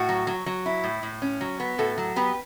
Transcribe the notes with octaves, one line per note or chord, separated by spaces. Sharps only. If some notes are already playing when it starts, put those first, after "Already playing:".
Already playing: A2 F#4
F#3
F#3
F#3
E4
A2
A2
C#4
F#3
B3
A2 F#4 A4
F#3
B3 G4 B4